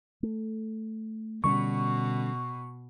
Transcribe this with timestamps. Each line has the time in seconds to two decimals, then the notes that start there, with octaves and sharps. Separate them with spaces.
0.23 A3
1.44 B2 D3 G3 C#4 C#6